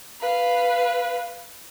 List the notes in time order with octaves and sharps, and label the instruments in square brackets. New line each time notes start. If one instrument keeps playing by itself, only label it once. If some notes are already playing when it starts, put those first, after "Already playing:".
[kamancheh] B4 F5